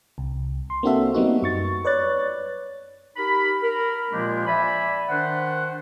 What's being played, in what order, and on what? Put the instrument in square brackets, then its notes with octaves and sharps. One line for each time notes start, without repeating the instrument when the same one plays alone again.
[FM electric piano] C2
C6
A#3 C4 D4 F#4 A4 E5
G3 A#3 B3 D#4 F#4
F#2 C#6 A6
B4 C#5 D5 F#6 A6
[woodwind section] D#4 G4 A#4 B5
A#4 B5
A#2 F3 G#3 A#3 D4 G4
D5 E5 G#5 B5
D#3 D4 C5 F#5